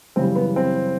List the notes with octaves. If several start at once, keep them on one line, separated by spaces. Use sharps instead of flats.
F#2 C#3 E3 G3 C4
B3
C4